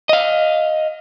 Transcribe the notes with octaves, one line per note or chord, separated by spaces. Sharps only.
D#5 F5